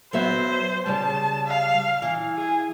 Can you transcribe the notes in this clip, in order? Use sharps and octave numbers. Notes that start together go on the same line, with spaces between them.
F#3 B3 C5 E5
C#3 G3 A5
F5
E3
G#4